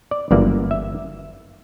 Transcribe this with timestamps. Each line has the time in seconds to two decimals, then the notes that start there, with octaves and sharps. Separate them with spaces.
0.11 D5
0.31 G1 F#2 E3 A#3 D5
0.71 E5